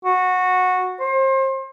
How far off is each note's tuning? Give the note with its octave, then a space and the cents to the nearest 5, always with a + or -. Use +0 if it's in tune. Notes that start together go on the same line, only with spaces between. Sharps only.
F#4 -15
C5 +35